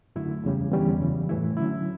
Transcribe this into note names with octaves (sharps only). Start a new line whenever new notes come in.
F#2 D3 A3 E4
E2 C#3 G3
E2 D3 G3 C#4
F#2 C#3 E3
A2 E3 A3 E4
D3 F#3 C#4 E4